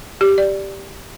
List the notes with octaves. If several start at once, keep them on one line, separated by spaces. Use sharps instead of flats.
G4
D5